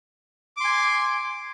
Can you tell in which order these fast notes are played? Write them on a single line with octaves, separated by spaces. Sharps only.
D6 C6 G#5